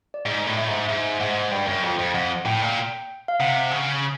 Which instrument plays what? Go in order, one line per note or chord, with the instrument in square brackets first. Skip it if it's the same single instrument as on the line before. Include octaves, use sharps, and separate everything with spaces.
[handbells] D5
[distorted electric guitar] G#2 [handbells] D#5
[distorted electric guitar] A2
[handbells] E5
[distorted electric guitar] G#2
[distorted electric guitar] G#2 [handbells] E5
[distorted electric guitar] G#2 [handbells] F#5
[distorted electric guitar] G2 [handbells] G5
[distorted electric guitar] F#2
[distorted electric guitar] F2 [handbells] G5
[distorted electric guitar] F2
[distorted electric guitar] F2 [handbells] F#5
[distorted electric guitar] A2 [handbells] G5
[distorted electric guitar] A#2
[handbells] F5
[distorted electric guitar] C3 [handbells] F#5
[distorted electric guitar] C#3